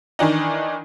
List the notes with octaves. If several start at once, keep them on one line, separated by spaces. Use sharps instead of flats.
D#3 E3 D4 D#4